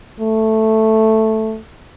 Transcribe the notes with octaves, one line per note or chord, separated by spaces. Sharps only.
A3